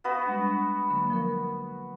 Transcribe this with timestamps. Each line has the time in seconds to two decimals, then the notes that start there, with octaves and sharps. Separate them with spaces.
0.04 B3 F#4 B4 F5
0.26 G3 G#3 D4
0.90 D3 F#3 A#3
1.10 F3 A#4